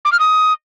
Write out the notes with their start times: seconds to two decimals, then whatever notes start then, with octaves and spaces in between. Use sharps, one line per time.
0.05 D6
0.12 F6
0.19 D#6